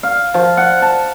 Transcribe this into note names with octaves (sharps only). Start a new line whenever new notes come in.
F5
F3
F#5
A5